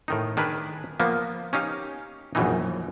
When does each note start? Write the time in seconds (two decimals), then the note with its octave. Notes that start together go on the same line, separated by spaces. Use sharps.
0.08 A2 D#3 D#4
0.37 D#3 D4 G#4 A#4 B4
1.00 F3 A#3 B3
1.53 C#4 D#4 G4 F5
2.35 A#1 F#2 B2 D#3 E3 D#4